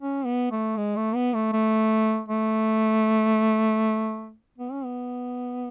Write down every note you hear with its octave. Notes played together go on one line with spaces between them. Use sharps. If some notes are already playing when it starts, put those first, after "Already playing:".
C#4
B3
A3
G#3
A3
B3
A3
A3
A3
B3
C#4
B3